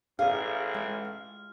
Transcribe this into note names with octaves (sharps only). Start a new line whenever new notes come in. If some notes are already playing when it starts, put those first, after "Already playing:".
A1 G#4 F5 F6
G#3 F4